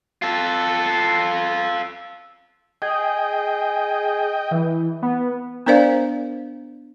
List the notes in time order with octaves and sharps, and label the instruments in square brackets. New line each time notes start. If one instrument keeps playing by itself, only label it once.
[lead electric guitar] F4 A4
[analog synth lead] G#4 [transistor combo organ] D#5 G5
[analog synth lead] E3
B3
[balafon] B3 D4 A#4 C5 D5 F5